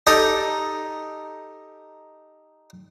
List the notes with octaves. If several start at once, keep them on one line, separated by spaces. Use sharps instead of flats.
D#4 G4 A4 D#5 G#5 A#5